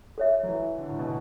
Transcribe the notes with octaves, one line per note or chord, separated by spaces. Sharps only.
A4 C#5 E5
F#3
E3
D3
A2
B2